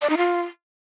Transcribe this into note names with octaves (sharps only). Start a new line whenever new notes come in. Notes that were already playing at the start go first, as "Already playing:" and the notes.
D5
D#4
F4